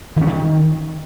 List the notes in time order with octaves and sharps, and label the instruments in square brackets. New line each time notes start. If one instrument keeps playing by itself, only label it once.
[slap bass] D#3
C#4
D#3